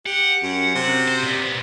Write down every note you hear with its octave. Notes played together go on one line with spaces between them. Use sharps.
G4 F#5
F#2
C3
C5
A#2 B3